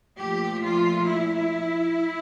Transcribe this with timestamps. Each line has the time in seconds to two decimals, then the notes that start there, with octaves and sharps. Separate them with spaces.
0.18 A#2 F3 A3 G4
0.63 F4
1.06 E4